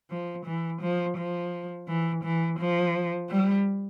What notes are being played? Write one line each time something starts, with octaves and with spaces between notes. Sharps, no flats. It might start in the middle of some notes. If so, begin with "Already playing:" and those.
F3
E3
F3
F3
E3
E3
F3
G3